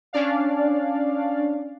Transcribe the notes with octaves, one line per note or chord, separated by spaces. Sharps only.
C#4 D4 D5 F5